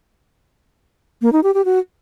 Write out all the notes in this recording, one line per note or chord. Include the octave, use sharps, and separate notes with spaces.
A#3
D#4
G4
G4
F#4